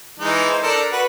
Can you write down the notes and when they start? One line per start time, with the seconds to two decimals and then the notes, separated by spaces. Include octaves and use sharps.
0.20 E3 G#3 D#4
0.51 C5
0.63 D4 A4 A#4
0.92 F#4 B4